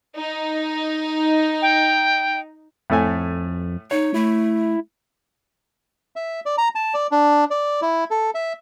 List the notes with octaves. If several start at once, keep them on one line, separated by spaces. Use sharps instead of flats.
D#4
G5
F2 A2 A3 G#5
D#4 C#5
A3 E4
E5
D5
A#5
A5
D5
D4
D5
E4
A4
E5